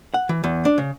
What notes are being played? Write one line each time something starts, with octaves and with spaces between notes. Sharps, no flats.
F#5
E3
E2
D4
C#3